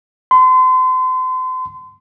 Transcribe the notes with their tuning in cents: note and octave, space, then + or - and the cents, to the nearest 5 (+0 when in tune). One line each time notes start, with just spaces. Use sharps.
C6 -35